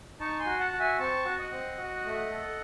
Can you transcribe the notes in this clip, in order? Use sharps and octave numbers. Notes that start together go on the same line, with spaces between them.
D#4 A5 C#6
G#5 C6
F#4
F#5 A5
F#4
E5 G#5
C4 A5 C#6
F#4
D#5 F#5
C4
F#4
A3
A4